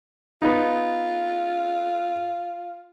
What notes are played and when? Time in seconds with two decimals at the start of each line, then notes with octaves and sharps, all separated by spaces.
0.42 B3 D#4 F4